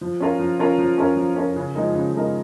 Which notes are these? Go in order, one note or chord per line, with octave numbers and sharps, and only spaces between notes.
F3
C#4 F4 A#4
F3
C#4 F4 A#4
F3
C#4 F4 A#4
F3
C#4 F4 A#4
C#3
F3 G#3 D#4 A#4
C#3
F3 G#3 D#4 A#4